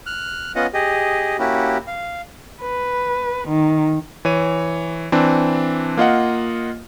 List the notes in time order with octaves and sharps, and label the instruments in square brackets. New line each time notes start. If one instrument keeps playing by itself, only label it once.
[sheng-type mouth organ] F6 F#6
B3 C#4 F4 D#5 F#5
G4 G#4 D#5
A#3 C#4 E4 F#4 G4
F5
[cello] B4
D#3
[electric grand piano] E3 C#5 D#7
E3 C4 D4
A#3 F4 D#5 F#5